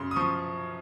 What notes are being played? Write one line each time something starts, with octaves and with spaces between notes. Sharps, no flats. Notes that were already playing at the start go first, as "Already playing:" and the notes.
Already playing: F#2 C#3 C6
D#6
F3 C#6